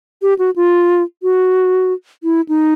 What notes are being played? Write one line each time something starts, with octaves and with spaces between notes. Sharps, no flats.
G4
F#4
F4
F#4
E4
D#4